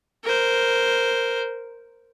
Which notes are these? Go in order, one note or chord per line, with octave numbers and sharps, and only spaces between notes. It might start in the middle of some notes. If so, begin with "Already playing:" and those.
A#4 C5